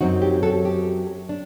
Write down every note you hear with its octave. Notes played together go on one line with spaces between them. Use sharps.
F#2 F#3 C4 D#4 F#4
G4
F#4 A4
G4
D4